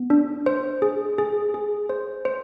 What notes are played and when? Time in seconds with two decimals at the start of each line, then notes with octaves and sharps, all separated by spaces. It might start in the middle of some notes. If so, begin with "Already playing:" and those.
Already playing: B3
0.10 D4
0.46 C5
0.82 G#4
1.18 G#4
1.54 G#4
1.89 C5
2.25 C5